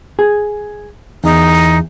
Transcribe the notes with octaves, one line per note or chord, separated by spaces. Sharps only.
G#4
E2 D#4